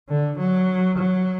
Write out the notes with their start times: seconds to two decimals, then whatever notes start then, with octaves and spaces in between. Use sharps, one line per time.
0.09 D3
0.38 F#3
0.97 F#3